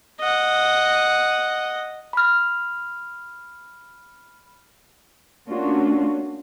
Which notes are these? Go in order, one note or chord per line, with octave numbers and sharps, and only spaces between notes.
D#5 F#5
B5 F6
A3 A#3 C#4 D4 F4 F#4